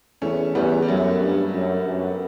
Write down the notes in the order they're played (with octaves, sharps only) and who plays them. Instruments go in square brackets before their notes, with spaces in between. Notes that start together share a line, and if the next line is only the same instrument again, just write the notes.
[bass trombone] E2 [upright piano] A3 C#4
[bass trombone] E2 [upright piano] G3 B3
[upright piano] G3
[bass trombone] F#2 [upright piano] F#3 A3
[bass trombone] G2
F#2
F#2